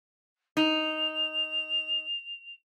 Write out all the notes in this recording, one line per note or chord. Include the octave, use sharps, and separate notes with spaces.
D#4 F7